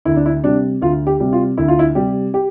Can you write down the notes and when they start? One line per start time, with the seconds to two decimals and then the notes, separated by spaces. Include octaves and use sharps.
0.05 D2 E4
0.16 D4
0.26 E4
0.44 C3 G3 D4
0.82 D2 F4
1.07 G4
1.20 C3 G3
1.33 F4
1.57 D2 E4
1.68 F4
1.79 E4
1.95 C3 G3 G4
2.34 G4